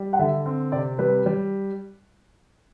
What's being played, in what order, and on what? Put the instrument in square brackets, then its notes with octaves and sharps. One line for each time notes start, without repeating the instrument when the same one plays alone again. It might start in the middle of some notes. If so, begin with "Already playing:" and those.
Already playing: [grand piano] G3
[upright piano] F#5
[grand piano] D3 [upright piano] E5
[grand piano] C4
[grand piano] C3 [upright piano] D5
[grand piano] G3 [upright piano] B4
[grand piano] G3